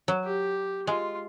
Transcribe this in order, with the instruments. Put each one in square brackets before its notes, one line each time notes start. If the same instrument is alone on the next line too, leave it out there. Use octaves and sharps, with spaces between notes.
[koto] F#3
[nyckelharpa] G4
[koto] G#3 [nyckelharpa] F4